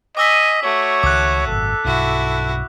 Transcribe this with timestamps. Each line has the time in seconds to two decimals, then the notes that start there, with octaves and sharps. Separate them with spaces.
0.17 D#5 G#5 D6 E6 B6
0.63 A3 F#4 C#5
1.03 C#2 D#3 D6 F#6
1.47 G#1 F#2 B2 A4
1.85 B1 G2 E4 F#4